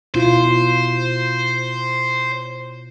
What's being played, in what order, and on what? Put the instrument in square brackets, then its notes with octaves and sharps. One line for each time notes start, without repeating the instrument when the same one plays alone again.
[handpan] B2 E4 F4 [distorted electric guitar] C5